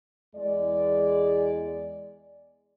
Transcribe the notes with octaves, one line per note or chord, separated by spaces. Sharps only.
E2 G#3 D5